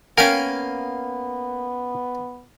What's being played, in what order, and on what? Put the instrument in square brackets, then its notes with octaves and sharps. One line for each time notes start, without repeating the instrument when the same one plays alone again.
[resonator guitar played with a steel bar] A#3 [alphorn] B3 [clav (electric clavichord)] C#4 A#4 [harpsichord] F5 G5 G#5